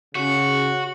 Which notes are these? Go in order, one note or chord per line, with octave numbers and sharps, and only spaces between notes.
C#3 F#4